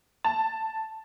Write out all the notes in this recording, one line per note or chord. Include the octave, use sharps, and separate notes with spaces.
A5